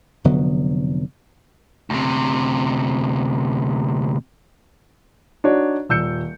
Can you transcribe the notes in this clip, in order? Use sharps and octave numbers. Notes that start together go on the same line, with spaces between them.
F1 D3 F#3 B3
D2 C3
D4 D#4 F#4 C#5 D5
D#1 E6 G6 C#7